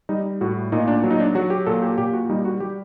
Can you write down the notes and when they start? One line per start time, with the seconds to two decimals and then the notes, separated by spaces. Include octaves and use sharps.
0.09 G3 D#4
0.41 A2 F#4
0.72 A#2 D#4
0.88 D4
1.04 F#3
1.11 D#4
1.20 D4
1.35 F#3 F#4
1.50 G4
1.66 A#2 A4
1.82 G4
1.98 A#2 G4
2.14 F#4
2.29 G3 D#4
2.45 F#4
2.60 G3 G4